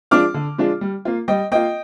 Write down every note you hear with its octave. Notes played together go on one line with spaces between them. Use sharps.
F3 G#3 D4 F4 D6 F6
D3
F3 G#3 D4 F4
G3
A#3 F4
G3 D#5 G5
A#3 F4 D#5 G5